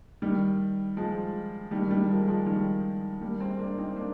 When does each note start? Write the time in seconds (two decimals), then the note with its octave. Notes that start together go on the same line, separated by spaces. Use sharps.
0.22 D#3 G3
0.97 F3 G#3
1.71 D#3 G3
1.90 D#3 G3
2.04 A#3
2.09 F3 G#3
2.27 F3 G#3
2.46 D#3 G3
3.21 G3 A#3
3.40 G#3 C4
3.59 A#3 D4
3.78 C4 D#4
3.96 A#3 D4